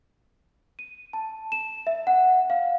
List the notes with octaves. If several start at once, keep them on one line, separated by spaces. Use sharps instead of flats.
D#7
A5
E7
E5
F#5
F5